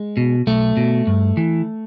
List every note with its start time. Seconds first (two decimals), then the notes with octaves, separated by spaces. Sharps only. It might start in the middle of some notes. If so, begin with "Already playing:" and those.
Already playing: G#3
0.17 B2
0.47 B1 A3
0.77 B2
1.07 G2
1.37 E3